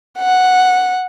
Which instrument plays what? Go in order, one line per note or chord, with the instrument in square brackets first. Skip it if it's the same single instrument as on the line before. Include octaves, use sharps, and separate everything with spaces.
[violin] F#5